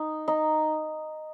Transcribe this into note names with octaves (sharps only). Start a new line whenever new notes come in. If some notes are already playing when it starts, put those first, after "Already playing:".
Already playing: D#4
D#4